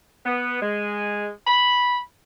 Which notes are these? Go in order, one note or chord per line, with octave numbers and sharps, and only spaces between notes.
B3
G#3
B5